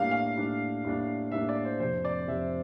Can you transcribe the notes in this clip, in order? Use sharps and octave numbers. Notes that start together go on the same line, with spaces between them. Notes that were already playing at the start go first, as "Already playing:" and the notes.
Already playing: A2 G3 A#3 D4 F5
F5
A2 G3 A#3 D4
A2 G3 A#3 D4
A2 G3 A#3 D4 E5
D5
C5
F1 F2 C3 C5
D5
F1 F2 C3 E5